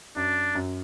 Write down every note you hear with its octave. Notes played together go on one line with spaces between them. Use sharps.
F#2 D4
F#2